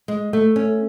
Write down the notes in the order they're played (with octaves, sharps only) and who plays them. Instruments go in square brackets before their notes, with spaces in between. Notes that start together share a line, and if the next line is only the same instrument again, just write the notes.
[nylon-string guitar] G#3
A3
C#4